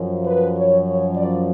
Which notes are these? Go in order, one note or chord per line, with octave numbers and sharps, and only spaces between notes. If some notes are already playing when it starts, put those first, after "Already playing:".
Already playing: F#2 F3
B4
C#5
C#5
D5